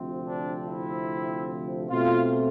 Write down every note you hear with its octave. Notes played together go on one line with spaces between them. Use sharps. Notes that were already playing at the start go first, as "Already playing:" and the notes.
Already playing: D2 C3 F3 C4
D4
E4
B2 A3 C4 F4